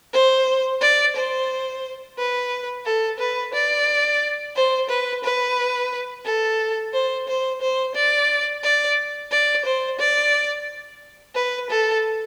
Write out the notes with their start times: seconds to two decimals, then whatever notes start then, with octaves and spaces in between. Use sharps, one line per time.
0.13 C5
0.81 D5
1.16 C5
2.18 B4
2.85 A4
3.19 B4
3.54 D5
4.55 C5
4.89 B4
5.24 B4
6.25 A4
6.93 C5
7.28 C5
7.61 C5
7.95 D5
8.63 D5
9.31 D5
9.65 C5
9.99 D5
11.35 B4
11.70 A4